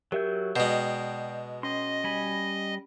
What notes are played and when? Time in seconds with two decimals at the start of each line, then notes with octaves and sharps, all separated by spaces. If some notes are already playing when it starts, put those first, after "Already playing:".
0.12 F#3 G4 A#4 E5 G6
0.56 B2 G#3 D5 G5 G6 C7
1.63 C#4 D#5 C6
2.04 G3 G#5 B5